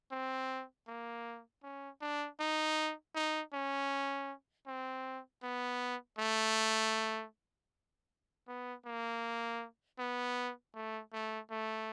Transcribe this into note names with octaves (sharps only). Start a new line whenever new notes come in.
C4
A#3
C#4
D4
D#4
D#4
C#4
C4
B3
A3
B3
A#3
B3
A3
A3
A3